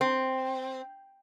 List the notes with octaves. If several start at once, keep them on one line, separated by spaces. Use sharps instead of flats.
C4